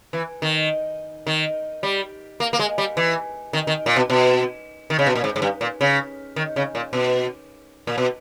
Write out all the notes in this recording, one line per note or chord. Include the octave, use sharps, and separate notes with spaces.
E3
D#3
D#3
G3
A#3
A#3
G#3
G3
E3
D#3
D#3
A#2
B2
B2
D#3
C#3
B2
A#2
G#2
G#2
G2
A#2
C#3
D#3
C#3
A#2
B2
A#2
B2